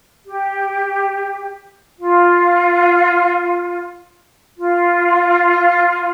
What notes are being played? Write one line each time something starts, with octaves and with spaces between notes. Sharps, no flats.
G4
F4
F4